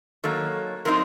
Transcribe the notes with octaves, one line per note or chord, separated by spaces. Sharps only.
D#3 F#3 A#3 A4
A#2 F#3 C4 D#4 A#4